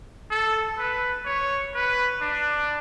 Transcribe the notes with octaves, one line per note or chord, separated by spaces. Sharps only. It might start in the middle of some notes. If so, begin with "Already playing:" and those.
A4
B4
C#5
B4
D4